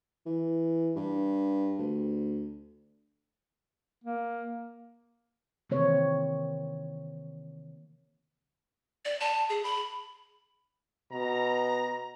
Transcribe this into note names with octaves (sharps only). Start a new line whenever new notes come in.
E3
G2
D2
A#3
C3 D#3 E3 A#3 C4 C#5
D5
A5
G#4
B5
B2 A#5